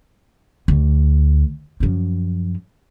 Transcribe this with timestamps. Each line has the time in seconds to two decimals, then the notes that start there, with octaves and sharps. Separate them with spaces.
0.68 D2
1.80 F#2 F3